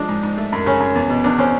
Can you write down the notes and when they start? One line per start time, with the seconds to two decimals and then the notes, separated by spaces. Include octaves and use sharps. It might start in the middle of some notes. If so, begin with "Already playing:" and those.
Already playing: F3 G#3 D4
0.09 G#2
0.23 G#2
0.37 A3
0.52 F#2
0.66 C#3 C#4
0.81 F#2
0.95 E2
1.10 B2
1.24 E2 D4
1.38 C4 C#4